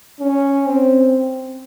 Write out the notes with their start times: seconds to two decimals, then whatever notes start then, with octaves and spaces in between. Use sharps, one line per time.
0.21 C#4
0.66 C4